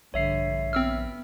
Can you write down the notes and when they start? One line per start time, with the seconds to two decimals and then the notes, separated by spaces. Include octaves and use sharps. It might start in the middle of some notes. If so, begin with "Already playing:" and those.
0.14 A#1 G2 D3 C#5 E5 C7
0.73 B3 C4 E6 F6